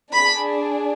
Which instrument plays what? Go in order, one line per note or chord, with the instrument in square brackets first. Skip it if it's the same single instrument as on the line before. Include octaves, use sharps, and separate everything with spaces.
[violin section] D4 G#4 B5